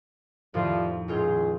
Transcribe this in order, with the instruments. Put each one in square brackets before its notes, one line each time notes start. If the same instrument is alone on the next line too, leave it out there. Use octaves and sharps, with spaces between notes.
[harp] F2 A2 D#3 [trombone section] F3 G3 F4
[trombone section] C#2 G#4 [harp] A#2 F4 G6